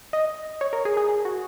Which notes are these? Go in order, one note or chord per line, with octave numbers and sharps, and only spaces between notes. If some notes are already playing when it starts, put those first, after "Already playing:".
D#5
C#5
A#4
G#4
G#4
G#4
F#4